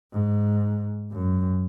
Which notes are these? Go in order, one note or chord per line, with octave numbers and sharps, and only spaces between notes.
G#2
F#2